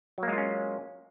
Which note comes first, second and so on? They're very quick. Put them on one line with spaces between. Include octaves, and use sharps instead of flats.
F#3 A#3 G#3 F4 C#4